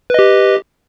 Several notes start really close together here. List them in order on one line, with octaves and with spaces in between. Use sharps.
B4 D#5 G4